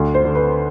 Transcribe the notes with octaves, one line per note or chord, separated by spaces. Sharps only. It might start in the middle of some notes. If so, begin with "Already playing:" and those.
Already playing: D2
C5
D3
B4